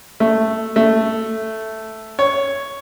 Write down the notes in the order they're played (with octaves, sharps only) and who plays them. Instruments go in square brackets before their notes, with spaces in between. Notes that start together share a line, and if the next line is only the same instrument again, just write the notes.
[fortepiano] A3
A3
C#5